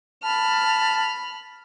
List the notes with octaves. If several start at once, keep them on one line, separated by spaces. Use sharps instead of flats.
A5 B5 F6